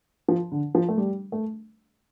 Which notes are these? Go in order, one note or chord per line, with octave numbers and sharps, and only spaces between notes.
F3
D3
F3
A3
G3
A3